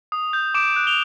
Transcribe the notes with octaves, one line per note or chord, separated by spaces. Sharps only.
D#6
G6
D6 D7 E7
F#6
F7 G7